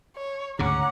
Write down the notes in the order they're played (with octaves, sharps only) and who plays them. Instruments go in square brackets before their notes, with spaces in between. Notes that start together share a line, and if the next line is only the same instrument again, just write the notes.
[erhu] C#5
[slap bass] D2 G#2 C#3 [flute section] C#4 A#5 D6 [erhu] F#5